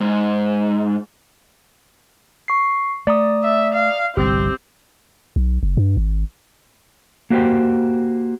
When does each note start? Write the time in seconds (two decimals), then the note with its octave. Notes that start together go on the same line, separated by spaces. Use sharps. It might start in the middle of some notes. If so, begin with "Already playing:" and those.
0.01 G#2
2.48 C#6 C7
3.07 A3 D5 A#5 D#6
3.44 E5
3.74 F5
4.17 G1 C2 C4 G4
5.36 B1
5.63 F#1
5.77 G2
5.97 G#1
7.30 A#3 F#4 G4 C5 G5